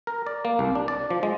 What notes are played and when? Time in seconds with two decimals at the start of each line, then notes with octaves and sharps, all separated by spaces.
0.07 A#4
0.27 D5
0.45 A#3
0.59 C2
0.75 D4
0.88 D5
1.10 F3
1.23 G#3